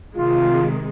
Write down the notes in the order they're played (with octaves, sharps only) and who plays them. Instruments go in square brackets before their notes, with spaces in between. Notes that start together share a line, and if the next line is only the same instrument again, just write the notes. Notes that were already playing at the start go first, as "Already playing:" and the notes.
[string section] C3 D#3 G#3 [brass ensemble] F4